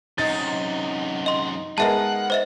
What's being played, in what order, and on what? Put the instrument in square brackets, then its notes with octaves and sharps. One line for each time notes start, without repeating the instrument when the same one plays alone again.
[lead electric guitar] F#2 C3 [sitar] D#4 [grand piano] A6
[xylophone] D#5 C6
[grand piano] G#3 B3 A#4 [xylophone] D#5 E5 A5 [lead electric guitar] F#5
[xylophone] C5 D#5 E5